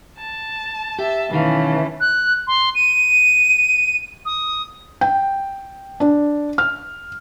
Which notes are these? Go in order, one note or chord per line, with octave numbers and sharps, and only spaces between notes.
A5
G4 E5 A5
B1 D#3 E3 A3 C#4 F5
F#6
C6
D#7
D#6
G5
D4
F6